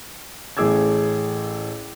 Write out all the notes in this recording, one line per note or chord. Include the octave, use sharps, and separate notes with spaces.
A1 A3 G#4 D6 E6 G#6